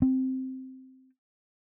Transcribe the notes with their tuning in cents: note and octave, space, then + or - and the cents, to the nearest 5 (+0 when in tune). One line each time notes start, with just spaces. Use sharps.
C4 -5